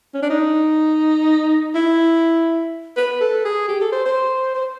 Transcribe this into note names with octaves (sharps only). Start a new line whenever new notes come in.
C#4
D4
D#4
E4
B4
A4
G#4
G4
A4
C5
C5
C5